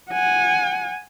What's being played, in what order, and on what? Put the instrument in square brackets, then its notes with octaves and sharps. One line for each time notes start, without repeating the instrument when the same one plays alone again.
[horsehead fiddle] F#5 G#5